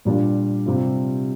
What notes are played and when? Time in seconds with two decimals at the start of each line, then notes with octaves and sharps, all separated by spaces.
0.05 A#2 G3 D4 F4
0.66 C3 G3 C4 F4